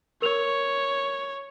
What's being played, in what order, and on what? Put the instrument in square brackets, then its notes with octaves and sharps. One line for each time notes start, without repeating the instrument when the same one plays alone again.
[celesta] A#4 F7 [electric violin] C#5